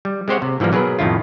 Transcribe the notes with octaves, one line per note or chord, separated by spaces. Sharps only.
G3
G#3 C4 G4 C5 C#5 F#5
C3
G#2 E3 F3 G3 A#3
B2 F#3 G#4 A#4 B4
F2 A2 D#3 E4 F4